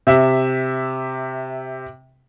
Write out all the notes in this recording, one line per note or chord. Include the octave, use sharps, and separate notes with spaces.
C3 E5